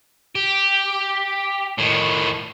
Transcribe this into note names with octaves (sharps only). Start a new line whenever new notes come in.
G4
A2 D#3